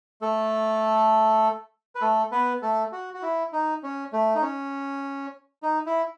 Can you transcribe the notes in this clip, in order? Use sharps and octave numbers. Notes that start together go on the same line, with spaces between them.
A3 A4
B4
A3 A4
B3 B4
A3 A4
F#4
F#4
E4
D#4
C#4
A3
D#4
C#4
D#4
E4